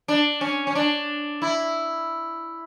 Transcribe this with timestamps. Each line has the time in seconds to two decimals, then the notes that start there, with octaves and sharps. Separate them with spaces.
0.08 D4
0.41 C#4
0.67 C#4
0.75 D4
1.42 E4